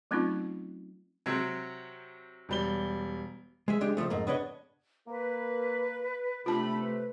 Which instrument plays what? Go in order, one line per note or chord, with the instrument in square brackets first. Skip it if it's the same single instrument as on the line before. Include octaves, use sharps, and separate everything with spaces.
[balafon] F#3 A3 C4 C#4 D#4 F4
[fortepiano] C3 F#3 C4 [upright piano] G#6
[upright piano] E1 G3 G7
[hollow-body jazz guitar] G#3 G#4 E5
C#2 G#3 D4 G4
C#2 B2 F3 A3
F2 G#2 A3 A#3
B3 D4 B4 C#5 D#5
[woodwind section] A#3 [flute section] B4
[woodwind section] C3 [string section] A3 [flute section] D4 B5 [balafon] F4 A5
[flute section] B4